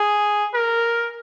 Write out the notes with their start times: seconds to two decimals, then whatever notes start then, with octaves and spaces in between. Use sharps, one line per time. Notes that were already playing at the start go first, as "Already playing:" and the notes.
Already playing: G#4
0.54 A#4